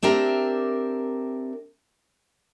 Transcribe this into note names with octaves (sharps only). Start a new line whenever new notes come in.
C4 D4 G4 A#4 E5